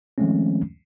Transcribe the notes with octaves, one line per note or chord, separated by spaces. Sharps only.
D#3 F3 G#3 A3 C4 C#4